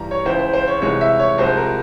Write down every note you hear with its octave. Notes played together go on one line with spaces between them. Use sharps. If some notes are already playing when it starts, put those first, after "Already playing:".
Already playing: G2 E3 G3 A#5
C#5
C#2 C#3 E3 C5
C5
C5
C#5
C2 C3 E3 G#3 C#5
E5
C#5
C2 C3 F3 G#3 C5
A#4